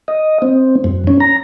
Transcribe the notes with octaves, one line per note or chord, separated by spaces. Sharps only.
D#5
C4
F#2
C#4
A#5